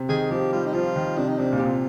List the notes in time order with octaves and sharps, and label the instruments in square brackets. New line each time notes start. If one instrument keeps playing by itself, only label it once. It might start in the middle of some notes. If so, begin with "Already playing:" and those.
Already playing: [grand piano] C3
[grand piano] D#3 [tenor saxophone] G#4
[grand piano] F3 [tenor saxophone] G4
[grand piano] G3 [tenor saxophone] F4
[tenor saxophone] D#4
[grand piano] F3 [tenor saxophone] F4
[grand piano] D#3
[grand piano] C3 [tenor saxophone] D4
[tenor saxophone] D#4
[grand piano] C3 [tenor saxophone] D4
[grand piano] A#2
[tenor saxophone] G4
[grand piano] C3 [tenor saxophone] F4